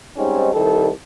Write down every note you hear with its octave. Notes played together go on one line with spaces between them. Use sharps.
G#2 G3 C4 C#4 D#4
C2 D#3 G3 A4